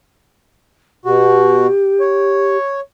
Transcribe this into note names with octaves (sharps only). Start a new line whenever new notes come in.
B2 F#4 G4
C#5